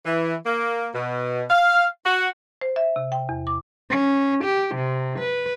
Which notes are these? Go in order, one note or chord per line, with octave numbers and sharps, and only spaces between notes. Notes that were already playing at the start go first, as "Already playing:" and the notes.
E3
A#3
B2
F5
F#4
C5
E5
C3
G5
E2
D6
C#4
G4
C3
B4